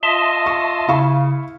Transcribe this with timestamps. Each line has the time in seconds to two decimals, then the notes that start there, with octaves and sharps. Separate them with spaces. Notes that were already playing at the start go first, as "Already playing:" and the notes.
0.03 F4 D#5 E5 A5 C6 D#6
0.46 C#6
0.88 C#3 E4 F5 C#6